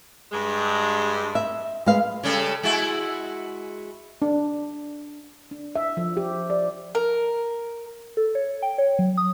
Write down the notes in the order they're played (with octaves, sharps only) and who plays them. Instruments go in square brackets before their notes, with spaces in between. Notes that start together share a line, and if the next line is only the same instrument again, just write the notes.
[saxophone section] G2 G#3
[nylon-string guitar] E5
G#3 B4 F5
[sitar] C#3 G3 A4
G#3 E4 F#4
[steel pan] D4
[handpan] D4
E5
F3
G4
D5
[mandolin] A#4
[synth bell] A4
C#5
G5
C#5
F#3
D#6